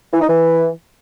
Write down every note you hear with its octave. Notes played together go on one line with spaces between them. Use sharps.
E3
D#4
E3